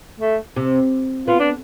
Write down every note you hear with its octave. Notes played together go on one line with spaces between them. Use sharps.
A3
C3
B3 F4
D4